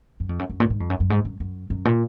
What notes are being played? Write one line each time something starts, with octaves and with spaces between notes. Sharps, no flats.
F#2
F2
F#2
F#2
A#2
G#2
F2
F#2
F#2
G#2
F#2
F#2
F#2
A#2